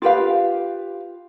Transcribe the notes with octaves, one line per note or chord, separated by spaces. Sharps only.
F4 G4 B4 F5